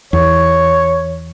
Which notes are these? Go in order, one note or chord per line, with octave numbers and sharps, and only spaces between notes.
E2 C#5